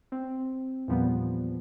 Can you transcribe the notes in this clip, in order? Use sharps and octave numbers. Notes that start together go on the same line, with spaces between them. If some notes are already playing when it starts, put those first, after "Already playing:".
C4
E2 A#2 F3 G3 B3